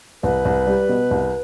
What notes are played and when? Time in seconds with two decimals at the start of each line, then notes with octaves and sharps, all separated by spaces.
0.23 C2 B4
0.45 C2
0.67 G3
0.89 B2
1.11 C2